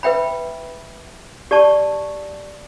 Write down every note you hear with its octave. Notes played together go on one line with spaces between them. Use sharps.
B4 E5 G5 B5
G4 D5 A5 C#6